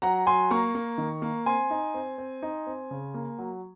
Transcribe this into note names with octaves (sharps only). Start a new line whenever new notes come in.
F#3 F#5 A#5
F#3 G#5 C6
A#3 A#5 C#6
A#3
D#3
A#3
C4 G#5 C6
D#4
C4
C4
D#4
C4
C#3
A#3
F#3